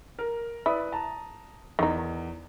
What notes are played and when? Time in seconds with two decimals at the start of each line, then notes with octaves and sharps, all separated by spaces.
0.19 A#4
0.66 E4 B4 D5 D#6
0.92 A5 A#5
1.79 E2 D#3 D#4